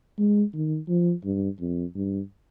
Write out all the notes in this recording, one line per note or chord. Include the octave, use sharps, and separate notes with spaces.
G#3
D#3
F3
G2
F2
G2